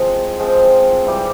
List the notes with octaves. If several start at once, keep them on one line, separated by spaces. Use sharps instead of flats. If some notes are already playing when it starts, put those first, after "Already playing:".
Already playing: F3 G#3 C4 F4
F3 G#3 C4 F4
E3 G3 C4 G4